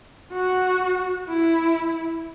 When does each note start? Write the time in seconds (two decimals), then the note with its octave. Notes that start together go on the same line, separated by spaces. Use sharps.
0.32 F#4
1.29 E4